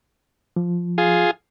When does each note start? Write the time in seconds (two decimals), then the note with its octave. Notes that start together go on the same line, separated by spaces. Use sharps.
0.56 F3
0.98 F4 G#4